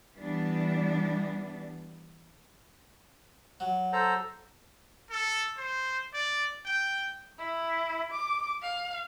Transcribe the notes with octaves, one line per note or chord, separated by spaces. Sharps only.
E3 G3 B3 D4
F#3
A4 C5 A#5
A4
C5
D5
G5
E4
D6
F5